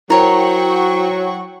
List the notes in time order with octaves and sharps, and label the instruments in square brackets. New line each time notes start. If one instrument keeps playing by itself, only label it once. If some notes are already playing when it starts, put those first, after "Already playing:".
[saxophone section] F#3 [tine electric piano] E4 C5 [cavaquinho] A#4 C#5 [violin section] F#5 G5 C#6